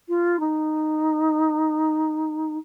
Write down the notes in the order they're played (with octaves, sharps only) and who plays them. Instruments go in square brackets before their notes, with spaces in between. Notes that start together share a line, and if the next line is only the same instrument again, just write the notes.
[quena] F4
D#4